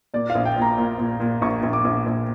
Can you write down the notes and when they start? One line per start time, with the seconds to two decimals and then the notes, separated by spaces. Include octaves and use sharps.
0.14 A#2 D5
0.30 F5
0.35 A#1
0.45 G5
0.57 A#2
0.62 A#5
0.78 A#2
0.98 A#2
1.20 A#2
1.42 A#1 C#6
1.63 A#1
1.73 D6
1.85 A#1
2.06 A#1